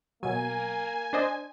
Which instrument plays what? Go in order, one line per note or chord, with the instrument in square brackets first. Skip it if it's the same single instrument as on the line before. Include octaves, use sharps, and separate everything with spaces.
[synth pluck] B2 F#3 [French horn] A#3 [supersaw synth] G#5
[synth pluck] D4 C5 D#5